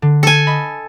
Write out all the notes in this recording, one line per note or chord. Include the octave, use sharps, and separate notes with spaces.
D3
A4 G#5
D#5 B5